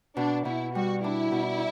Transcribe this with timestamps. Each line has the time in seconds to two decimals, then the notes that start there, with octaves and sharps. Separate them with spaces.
0.17 B2 D4
0.45 B2 E4
0.75 G3 F#4
1.04 D4 E4
1.32 B2